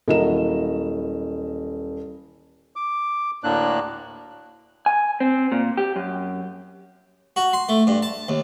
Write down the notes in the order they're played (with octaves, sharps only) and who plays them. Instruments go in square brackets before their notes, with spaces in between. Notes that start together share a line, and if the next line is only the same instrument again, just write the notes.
[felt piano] D#1 D#5 E7 [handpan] E4 F#4 A#4
[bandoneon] D6
D2 A2 A#3 D4 F#6
[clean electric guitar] G#5
C4
A#2
G4
F#2
[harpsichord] F#4
C6
A3
G2
A5
D#2